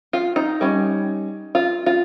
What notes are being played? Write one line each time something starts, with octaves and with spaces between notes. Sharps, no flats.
F4
D#4
G3 C#4
F4
F4